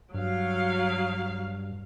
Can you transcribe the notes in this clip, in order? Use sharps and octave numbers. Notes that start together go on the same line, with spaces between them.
G2 F#3 F5